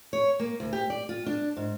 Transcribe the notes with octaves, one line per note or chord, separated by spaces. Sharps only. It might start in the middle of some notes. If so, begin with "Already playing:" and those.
C#5
A#3
D2
G4
D5
F4
D4
G#2